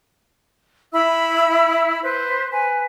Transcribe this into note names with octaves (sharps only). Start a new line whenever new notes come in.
E4 E5 B5 E6
B4 C5
B4 G#5